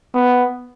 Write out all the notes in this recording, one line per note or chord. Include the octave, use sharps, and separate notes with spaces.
B3